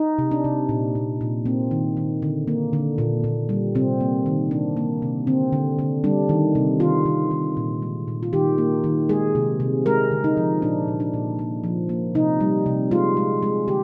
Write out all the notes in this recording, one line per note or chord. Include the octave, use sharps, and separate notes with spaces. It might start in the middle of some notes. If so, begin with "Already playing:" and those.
Already playing: D#4
C3
D4
C3
A#2
A#2
A#2
A#3 C4
D#3
D#3
D3
A#3
D3
A#2
A#2
G3
C3 C4
A#3
D#3
C3 D4
A#3
C3
D3 C4
D3
D3
G3 D4
D#3
C3
D#3 F4
D#3
D#3
A#2
G#3
A#2
F4
D#3 G4
A#3
D#3
G#3 G#4
C3
C3
G#3 A#4
D3
D#4
F3
A#2 D4
A#2
D4
A#2
A#3
F3
A#3
C3 D#4
G3
C3
G#3 F4
G#3
G#3
D3 G4